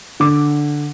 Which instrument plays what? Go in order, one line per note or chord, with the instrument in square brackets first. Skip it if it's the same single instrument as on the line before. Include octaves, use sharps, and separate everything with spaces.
[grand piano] D3 D6